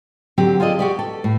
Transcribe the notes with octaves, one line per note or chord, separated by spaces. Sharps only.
D3 F#3 C4 G4
F4 G#4 A4 D5 D#5
F#4 G4 D5
A4
A2